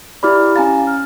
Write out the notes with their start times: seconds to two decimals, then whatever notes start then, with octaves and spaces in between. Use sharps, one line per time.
0.23 E4 G4 D5 B5 D6 F6
0.56 C#4 F5 G#5 A#5 A6
0.87 F6